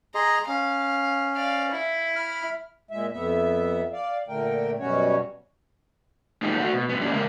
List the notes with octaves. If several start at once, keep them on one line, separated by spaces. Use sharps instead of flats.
G#4 D#5 A#5 C6
C#4 F5
D5 F5
E4
B5 F6
A#2 G#3 E5
F2 B3 E5
D5 F5
A#2 D3 A3 A#4 G5
F#2 B2 G3 C#4 F#4 C#5
G#3 A#3 D#4 F4 G4
A3 F#4
B2
G2 B3
A3 A#3 C#4 D4 F4 G4
C#3 G#3 A#4 F5